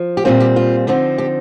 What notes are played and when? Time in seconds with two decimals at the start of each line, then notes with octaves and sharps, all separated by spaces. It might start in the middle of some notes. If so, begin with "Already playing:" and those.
Already playing: F3
0.17 G4
0.25 A#2 G3 C4 F4
0.40 G4
0.56 F4
0.87 D3 F3 C4 D#4
1.18 G4